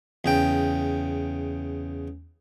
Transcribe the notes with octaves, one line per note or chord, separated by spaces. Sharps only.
E2 C#3 G5